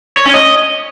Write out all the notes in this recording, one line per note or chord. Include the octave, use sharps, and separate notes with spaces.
C#5
C#4
D#5